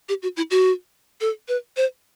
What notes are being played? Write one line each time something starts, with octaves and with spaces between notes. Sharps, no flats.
G4
F#4
E4
F#4
A4
B4
C5